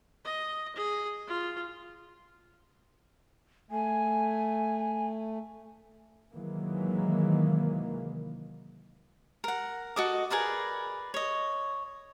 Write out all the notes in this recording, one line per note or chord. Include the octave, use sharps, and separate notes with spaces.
D#5
G#4
F4
A3 G#5
C3 D#3 E3 F#3 G#3 A#3
A#4 F#5
F#4 A4 D#5 D6
G#4 A#4 B4 D5
C#5 D#5